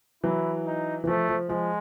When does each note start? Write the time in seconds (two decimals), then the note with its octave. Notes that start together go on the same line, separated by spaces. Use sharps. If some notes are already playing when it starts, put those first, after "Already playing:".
0.24 E3 F#3 E4
0.66 D#4
1.04 E3
1.07 F3 A3
1.29 F3
1.49 F3 G#3